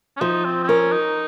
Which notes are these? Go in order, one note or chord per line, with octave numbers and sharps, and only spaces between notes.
C#4
F3 D#4
C4
C4
C#4 A#4
D#4